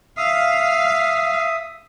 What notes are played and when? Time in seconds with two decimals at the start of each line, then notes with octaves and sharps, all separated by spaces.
0.17 E5 F5 D#6